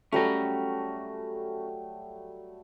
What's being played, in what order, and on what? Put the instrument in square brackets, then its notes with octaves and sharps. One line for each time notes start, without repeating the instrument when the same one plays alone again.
[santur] F#3 G3 A3 [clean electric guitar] C#4 A#5